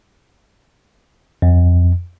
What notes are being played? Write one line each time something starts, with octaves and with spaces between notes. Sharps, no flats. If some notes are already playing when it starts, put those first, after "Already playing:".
F2